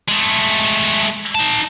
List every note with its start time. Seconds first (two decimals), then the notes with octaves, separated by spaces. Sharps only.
0.09 G#3 A3
1.35 D#4 A5